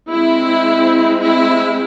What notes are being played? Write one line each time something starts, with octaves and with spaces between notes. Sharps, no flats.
G#3 C4 E4
E4